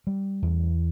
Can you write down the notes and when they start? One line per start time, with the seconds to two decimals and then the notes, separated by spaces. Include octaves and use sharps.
0.07 G3
0.42 E2